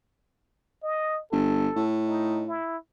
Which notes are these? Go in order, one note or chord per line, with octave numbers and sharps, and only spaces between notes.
D#5
G1 A4
A2
D#4
E4